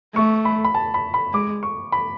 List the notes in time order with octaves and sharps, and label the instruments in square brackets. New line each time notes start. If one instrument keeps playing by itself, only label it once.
[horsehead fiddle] A3 [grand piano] C#6
[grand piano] B5
B5
A5
B5
B5
[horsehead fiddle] G#3 [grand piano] D6
[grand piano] C#6
B5